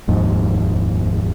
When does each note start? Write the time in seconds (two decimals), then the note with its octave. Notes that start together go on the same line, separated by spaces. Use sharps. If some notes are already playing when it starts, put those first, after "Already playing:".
0.08 F1 D#2 G#2 F3